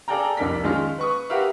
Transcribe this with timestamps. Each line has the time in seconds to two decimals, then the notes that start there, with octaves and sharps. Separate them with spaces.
0.08 G#4 A4 D5 F5 G5 A#5
0.37 C2 F2 D#4 A#4 D5 B6
0.64 D#3 G#3 C#4 D#4 F4
0.98 B4 C#6 D#6
1.30 F#4 G4 A#4 B4 E5 F5